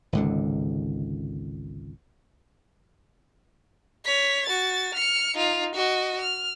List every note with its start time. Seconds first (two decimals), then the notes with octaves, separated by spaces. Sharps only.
0.13 G#1 C#2 D3
4.05 C#5 B6
4.46 F#4 A6
4.95 F6 C#7
5.37 D#4 F4
5.75 F#4 D#5
6.21 F6